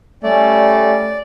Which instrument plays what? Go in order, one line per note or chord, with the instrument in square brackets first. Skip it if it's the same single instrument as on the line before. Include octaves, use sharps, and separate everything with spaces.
[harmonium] G3 C#4 [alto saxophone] A3 [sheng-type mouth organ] D5